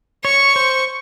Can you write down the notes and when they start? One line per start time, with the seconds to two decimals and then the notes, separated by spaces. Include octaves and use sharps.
0.25 C#5 C#6
0.56 C5